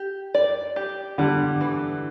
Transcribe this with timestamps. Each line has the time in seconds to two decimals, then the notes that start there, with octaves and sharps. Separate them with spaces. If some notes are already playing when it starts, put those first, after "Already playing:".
Already playing: G4
0.35 D5
0.76 G4
1.18 D3 G3
1.61 E3